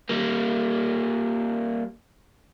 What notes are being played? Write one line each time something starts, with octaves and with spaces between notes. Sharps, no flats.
G3 A#3